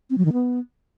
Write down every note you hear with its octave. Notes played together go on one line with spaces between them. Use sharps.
C4
F#3
D#3
B3